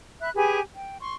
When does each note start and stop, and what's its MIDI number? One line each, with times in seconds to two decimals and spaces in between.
0.21 0.30 76
0.21 0.30 83
0.21 0.30 90
0.35 0.59 67
0.35 0.59 68
0.35 0.59 71
0.35 0.59 80
0.75 0.98 79
1.00 1.15 84
1.00 1.15 85